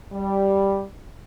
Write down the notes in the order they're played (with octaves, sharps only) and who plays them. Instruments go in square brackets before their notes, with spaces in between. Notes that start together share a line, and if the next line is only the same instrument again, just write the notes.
[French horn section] G3